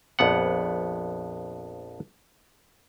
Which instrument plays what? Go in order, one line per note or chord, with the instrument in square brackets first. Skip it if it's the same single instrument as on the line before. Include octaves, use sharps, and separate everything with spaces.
[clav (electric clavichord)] A#1 F2 B3 F#5